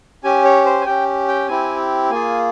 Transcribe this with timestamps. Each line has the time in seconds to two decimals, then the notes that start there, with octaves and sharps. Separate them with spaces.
0.24 C#4 G4 G#5
0.45 C#5
0.66 C5
0.81 G#5
0.85 C#4 G4 G5
1.28 G5
1.48 C4 E4 G4 G#5
2.11 A#3 F4 G#4 G#5